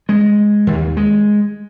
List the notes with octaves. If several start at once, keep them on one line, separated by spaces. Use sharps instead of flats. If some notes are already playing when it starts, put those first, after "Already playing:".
G#3
D#2
G#3